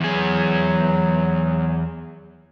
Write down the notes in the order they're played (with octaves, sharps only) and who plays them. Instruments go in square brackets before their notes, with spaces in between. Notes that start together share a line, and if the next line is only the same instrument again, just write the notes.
[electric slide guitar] E2 G#4 [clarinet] F#3